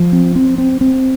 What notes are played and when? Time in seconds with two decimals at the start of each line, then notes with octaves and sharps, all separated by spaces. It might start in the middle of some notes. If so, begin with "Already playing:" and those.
Already playing: F3
0.13 C4
0.35 C4
0.58 C4
0.81 C4